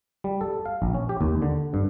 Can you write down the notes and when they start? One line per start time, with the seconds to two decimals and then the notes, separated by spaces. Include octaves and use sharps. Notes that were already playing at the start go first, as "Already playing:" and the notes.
0.24 G3
0.41 A4
0.66 F5
0.82 A#1
0.94 C#4
1.09 G4
1.21 D#2
1.42 D3
1.74 G2